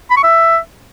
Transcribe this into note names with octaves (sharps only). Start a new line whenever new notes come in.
B5
C#6
E5